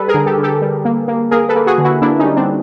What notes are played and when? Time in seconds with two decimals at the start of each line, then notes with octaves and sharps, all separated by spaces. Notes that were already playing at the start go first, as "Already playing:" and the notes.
Already playing: G3 A4 B4
0.08 G#4 A#4
0.14 D3
0.26 G4 A4
0.38 D3
0.43 G4 A4
0.62 G3
0.85 A#3
1.08 A#3
1.31 A#3 G#4 A#4
1.49 A4 B4
1.55 A#3
1.66 F#4 G#4
1.78 D3
1.84 E4 F#4
2.02 A#3 D4 E4
2.19 C#4 D#4
2.25 G3
2.36 C4 D4